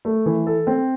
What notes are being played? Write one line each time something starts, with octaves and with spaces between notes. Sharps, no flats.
A3
E3
A4
C4